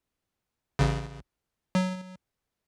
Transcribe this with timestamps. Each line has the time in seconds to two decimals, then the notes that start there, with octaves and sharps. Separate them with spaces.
0.79 A1 C#3
1.75 F#3